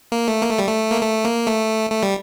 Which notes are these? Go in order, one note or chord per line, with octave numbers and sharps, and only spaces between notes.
A#3
A3
A#3
A3
G3
A3
A#3
A3
A#3
A3
A3
G3